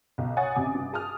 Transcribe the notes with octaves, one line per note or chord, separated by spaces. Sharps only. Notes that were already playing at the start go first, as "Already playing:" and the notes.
B1
C#5 F#5 G#5 D#6 A6
A1 C3 G#5 D6
G2
G#4 A5 D#6 F6